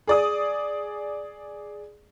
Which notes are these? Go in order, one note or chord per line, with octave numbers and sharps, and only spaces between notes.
G#4 D5 D#6